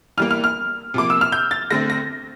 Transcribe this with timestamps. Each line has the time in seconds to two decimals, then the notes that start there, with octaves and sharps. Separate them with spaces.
0.17 E3 G3 A#3 F6
0.31 F6
0.44 F6
0.94 C3 F3 A#3 D6
1.10 E6
1.21 F6
1.32 G6
1.51 A6
1.71 D3 A3 C4 A#6
1.90 A#6